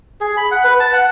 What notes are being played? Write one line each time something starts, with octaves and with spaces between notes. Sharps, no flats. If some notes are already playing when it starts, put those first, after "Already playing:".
G#4
B5
F#5
B4
A5
F#5